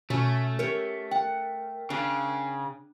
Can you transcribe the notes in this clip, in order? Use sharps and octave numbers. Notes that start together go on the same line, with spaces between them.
B2 A3 C#4
G4 A#4 C#5
F#5 G5
C#3 D4